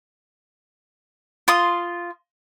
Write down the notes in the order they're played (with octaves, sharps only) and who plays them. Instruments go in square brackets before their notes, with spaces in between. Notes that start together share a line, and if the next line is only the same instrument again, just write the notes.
[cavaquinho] F4 C6 D#6